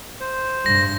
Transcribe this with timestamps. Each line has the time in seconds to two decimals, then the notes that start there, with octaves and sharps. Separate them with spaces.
0.20 C5
0.66 G2 A#6